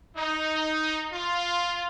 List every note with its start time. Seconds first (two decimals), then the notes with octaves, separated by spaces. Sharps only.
0.16 D#4
1.13 F4